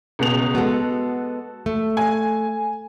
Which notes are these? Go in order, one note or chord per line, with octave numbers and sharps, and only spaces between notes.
C#2 B2 F7
G#3 B3 F#4 A4
A3
G#5